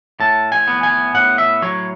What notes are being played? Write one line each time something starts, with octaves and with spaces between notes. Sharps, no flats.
A2 A5
G#5
B3
G#5
A2 F#5
E5
F#3 C#5